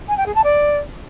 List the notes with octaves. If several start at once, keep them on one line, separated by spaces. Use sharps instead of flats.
G#5
G5
G#4
A5
D5